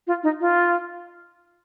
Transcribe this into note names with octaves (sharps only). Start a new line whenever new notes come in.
F4
D#4
F4